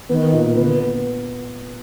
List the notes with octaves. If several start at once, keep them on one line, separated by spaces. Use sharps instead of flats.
D#3 B3
A#2
D3 B3